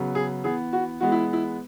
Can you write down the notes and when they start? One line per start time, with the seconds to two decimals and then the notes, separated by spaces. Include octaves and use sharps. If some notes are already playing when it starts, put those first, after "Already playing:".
Already playing: C#3 F#3 B3
0.15 G#4
0.44 E3 B3 G#4
0.73 F#4
1.00 E3 G#3 B3 F#4
1.12 E4
1.33 E4